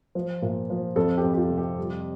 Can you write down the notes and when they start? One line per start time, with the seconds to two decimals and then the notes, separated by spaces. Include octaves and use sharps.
0.15 F3
0.42 A#2
0.70 F3
0.96 F2 A4
1.17 G4
1.23 F2
1.34 G4
1.37 F4
1.50 C3
1.57 G4
1.78 G3